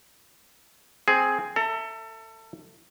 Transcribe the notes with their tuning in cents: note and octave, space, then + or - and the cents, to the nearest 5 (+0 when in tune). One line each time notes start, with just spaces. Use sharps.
C4 +0 G#4 +10
A4 +25 E5 +0 A#5 -5